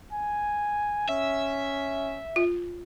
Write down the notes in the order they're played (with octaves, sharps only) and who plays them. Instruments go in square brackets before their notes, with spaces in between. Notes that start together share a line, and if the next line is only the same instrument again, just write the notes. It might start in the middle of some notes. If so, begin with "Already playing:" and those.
[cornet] G#5
[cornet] C#4 [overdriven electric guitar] E5
[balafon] F4